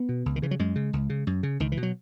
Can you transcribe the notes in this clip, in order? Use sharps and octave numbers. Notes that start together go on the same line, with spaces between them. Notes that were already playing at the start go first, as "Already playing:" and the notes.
Already playing: B3
B2
C#2
D#3
C#3 E3
F#3
F#2 G#3
C#3
C#2
C#3
F#2
C#3
C#2 D#3
E3
B2
F#3